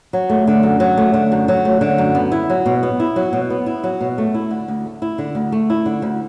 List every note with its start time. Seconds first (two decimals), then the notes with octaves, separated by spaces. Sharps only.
0.13 F#3
0.30 A3
0.47 D3
0.63 F#2
0.80 F#3
0.98 A3
1.14 D3
1.32 F#2
1.48 F#3
1.65 A3
1.81 D3
1.98 F#2
2.15 B3
2.32 E4
2.50 F#3
2.66 B2
2.83 B3
3.00 E4
3.16 F#3
3.33 B2
3.50 B3
3.66 E4
3.84 F#3
4.01 B2
4.18 A3
4.34 E4
4.51 D3
4.68 D2
4.85 A3
5.02 E4
5.18 D3
5.35 D2
5.52 A3
5.70 E4
5.86 D3
6.02 D2